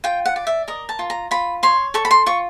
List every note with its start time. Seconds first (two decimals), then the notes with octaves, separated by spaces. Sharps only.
0.04 F4 G5
0.26 F#5
0.36 D5
0.47 E5
0.68 A#4 D#5
0.89 A5
0.99 F4
1.10 A#5
1.31 F4 B5
1.63 C#5 C6
1.94 A4 C#6
2.05 B5
2.11 C6
2.26 F4 C#6